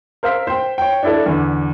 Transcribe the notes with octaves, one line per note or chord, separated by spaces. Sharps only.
A#4 C5 F5 E6 B6
C5 G5
C#5 G5
D4 E4 A4
E2 D3